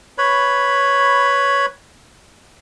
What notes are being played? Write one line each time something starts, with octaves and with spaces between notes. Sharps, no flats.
B4 C#5 B5